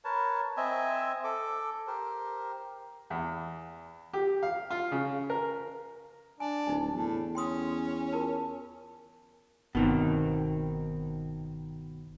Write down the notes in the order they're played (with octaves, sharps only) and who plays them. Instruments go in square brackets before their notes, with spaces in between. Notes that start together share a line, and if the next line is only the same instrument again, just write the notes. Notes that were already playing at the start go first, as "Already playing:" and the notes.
[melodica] A#4 B4 C#5 A5
C4 D#5 E5 G#5
A4 D6
G4 A#4 C5
[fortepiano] E2
G4
F5
F4
C#3
A#4
[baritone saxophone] D4 [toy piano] G#5
[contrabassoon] D1 [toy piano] D#4 G#5
[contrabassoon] E2 [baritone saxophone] A2
[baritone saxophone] C#4 [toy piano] G5 C6 D#6
[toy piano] F4 A#4 A5
[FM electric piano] G1 [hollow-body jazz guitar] B2 D#3 C4